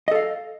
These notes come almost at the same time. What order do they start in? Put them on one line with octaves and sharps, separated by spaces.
D#5 A4 F5